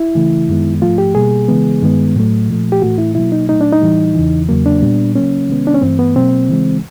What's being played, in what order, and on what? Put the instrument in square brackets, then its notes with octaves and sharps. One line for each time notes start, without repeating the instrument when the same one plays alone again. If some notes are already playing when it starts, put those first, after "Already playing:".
Already playing: [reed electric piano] E4
C#3 E3 A3
F#2 D#3 G#3 B3
G#2 F3 A3 F4
G4
B2 G3 A#3 G#4
C#3 E3 G#3 B3
G2 D#3 G#3 B3
A2 F#3 A3
A#2 F3 A3
G4
A2 E3 A3 F#4
E4
B2 F#3 A#3 E4
D#4
A#2 F#3 A3 D#4
D4
D#4
A2 E3 G3
E2 C#3 E3
E2 C#3 F#3 A#3
D4
A#2 G3 B3
C#3 F#3 A#3 C#4
C3 D#3 G#3 B3
D4
C#4
G2 E3 A3 C4
B3
B2 F#3 A#3 C4
C#3 E3 G#3